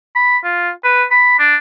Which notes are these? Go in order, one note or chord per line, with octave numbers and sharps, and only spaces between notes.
B5
F4
B4
B5
D4